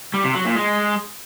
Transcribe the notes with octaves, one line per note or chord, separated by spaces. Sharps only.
G3
C3
F#3
A#2
G#3